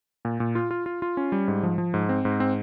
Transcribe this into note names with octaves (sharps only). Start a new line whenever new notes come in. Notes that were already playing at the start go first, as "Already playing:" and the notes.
A#2
A#2
F4
F4
F4
F4
C#4
G3
G#2
F3
F3
G#2
C4
G#2
C4